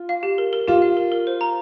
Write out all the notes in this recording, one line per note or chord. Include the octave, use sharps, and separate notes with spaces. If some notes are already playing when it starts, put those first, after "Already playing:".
Already playing: F4
F5
G4
A#4
A#4
F4 G4
F5
A#4
A#4
C5
A#5